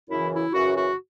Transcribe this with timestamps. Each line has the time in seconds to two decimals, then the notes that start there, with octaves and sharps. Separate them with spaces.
0.09 F#2 C#3 E3 E4
0.32 E4
0.53 F#2 C#3 E3 F#4
0.74 F#4